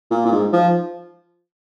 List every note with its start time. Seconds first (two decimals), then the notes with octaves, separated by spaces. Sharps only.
0.11 A#2
0.26 A#2
0.32 G#2
0.53 F3